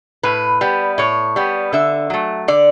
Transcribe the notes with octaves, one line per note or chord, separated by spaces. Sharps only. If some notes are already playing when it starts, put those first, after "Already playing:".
A2 B4
G3 B3
A2 C#5
G3 B3
D3 E5
F#3 A3
D3 D5